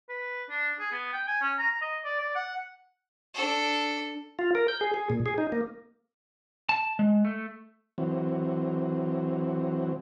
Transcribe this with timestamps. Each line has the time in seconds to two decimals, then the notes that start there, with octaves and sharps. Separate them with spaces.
0.09 B4
0.50 D4
0.79 G#4
0.92 B3
1.13 G5
1.28 G#5
1.41 C#4
1.59 A#5
1.81 D#5
2.05 D5
2.20 D5
2.35 F#5
3.34 D4 A4
4.39 F4
4.55 A#4
4.68 G6
4.81 G#4
4.94 G#4
5.10 A#2
5.26 G#4
5.38 D#4
5.52 A#3
6.69 A5
6.99 G#3
7.25 A3
7.98 E3 F#3 C4